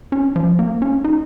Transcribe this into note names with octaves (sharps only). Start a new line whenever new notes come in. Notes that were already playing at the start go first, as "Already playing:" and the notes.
C#4
F3
A#3
C#4
D#4